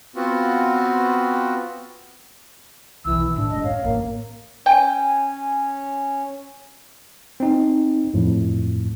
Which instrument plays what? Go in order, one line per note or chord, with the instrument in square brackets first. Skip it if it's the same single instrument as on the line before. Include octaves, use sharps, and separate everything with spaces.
[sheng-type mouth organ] B3 C4 F4 F#4
[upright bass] B1 D#3 [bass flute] E3 [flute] E6
[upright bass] A2 [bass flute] D4
[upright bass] G#3 [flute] D#5
[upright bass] F#2 [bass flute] C#5 [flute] F5
[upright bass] A1 [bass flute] A#3
[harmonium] C#4 [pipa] G5 [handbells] G#5
[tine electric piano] C4 D#4
F2 A2